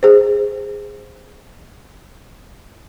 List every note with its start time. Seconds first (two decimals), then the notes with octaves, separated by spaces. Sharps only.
0.03 G#4 C5